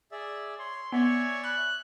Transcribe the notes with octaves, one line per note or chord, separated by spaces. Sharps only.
G#4 D5 E5
C#5 C6
B3 C#5 D5 E5 G#5
B5 F#6